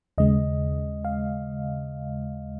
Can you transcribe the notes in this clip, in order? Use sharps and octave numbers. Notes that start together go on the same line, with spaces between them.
D#2 C#3 G#3 D#5
F5